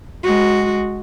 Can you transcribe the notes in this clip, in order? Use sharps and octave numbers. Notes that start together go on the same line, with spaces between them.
G#3 F#4